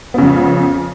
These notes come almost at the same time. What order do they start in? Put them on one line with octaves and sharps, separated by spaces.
B3 C#3 F2